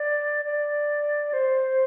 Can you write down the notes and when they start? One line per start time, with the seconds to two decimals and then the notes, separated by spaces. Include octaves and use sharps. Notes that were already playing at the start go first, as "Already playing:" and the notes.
Already playing: D5
0.45 D5
1.33 C5